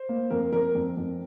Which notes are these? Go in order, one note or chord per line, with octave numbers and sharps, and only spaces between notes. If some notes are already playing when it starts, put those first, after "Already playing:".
Already playing: C5
A#3
F2 A#4
F2 A#4
F2
F2